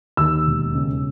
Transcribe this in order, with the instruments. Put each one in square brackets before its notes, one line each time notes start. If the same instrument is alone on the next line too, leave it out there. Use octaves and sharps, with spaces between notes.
[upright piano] D#2 E6
E1
C#3